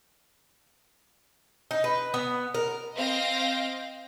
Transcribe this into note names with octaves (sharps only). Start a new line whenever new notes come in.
D#4
B4
B3
A#4
C4 D#5 F5 G5 A#6